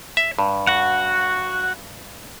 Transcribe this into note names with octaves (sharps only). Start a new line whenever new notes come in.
E5
G2
F#4 F#5